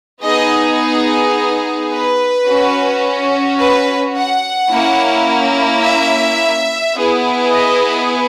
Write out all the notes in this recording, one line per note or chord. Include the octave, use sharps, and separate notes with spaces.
B3 D#4 G#4 D#5
B4
C#4 F#4
B4
F#5
A#3 C#4 E4
E5
B3 E4 G#4
D#5